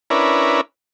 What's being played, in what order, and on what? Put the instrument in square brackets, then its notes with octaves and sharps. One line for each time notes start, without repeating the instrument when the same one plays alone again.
[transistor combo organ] C#4 D4 E4 A#4 B4